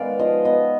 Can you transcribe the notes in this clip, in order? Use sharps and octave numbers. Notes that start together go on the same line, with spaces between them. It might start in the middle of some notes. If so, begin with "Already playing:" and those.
Already playing: D#3 G#3 B3 D5 F5
F3 D#5
B3 D#5